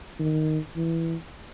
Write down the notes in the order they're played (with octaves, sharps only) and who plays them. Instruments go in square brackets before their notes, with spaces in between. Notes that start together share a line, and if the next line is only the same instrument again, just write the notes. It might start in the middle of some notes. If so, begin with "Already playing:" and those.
[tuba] D#3
E3